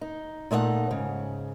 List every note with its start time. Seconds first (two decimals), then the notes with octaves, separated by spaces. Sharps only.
0.01 D#4
0.51 A#2 A3 D#4 D5 F#5
0.90 G#2 C#3